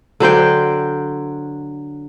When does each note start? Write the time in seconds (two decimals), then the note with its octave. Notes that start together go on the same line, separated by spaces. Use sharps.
0.20 D3 F#3 C5 G5